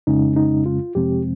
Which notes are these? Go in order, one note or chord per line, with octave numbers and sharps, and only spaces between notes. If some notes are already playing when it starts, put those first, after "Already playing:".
F2 C#3 G#3 C#4 D#4
D#4
F4
F2 C3 F3 G#3 C4 G4